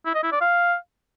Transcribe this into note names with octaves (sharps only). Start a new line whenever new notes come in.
E4
D#5
E4
D5
F5